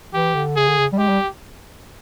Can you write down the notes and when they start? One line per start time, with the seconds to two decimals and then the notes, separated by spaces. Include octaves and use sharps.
0.14 E3 G4
0.35 D3
0.56 C#3 G#4
0.68 D3
0.78 C#3
0.93 G3
0.98 G#3 G4
1.09 G3